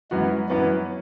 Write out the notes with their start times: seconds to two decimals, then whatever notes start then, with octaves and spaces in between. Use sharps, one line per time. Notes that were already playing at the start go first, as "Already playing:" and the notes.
0.11 F#2 E3 G#3 B3 F#4
0.50 F#2 E3 F#3 B3 F#4